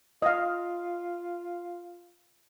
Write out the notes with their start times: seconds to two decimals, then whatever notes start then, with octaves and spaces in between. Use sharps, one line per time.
0.22 F4 D#5 F5